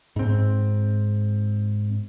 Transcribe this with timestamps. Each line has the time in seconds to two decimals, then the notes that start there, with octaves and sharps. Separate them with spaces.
0.16 G#2 C4